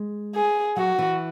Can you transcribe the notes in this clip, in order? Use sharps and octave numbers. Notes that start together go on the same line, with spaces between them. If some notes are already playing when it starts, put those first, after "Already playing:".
Already playing: G#3
G#4
F#3 F#4
E3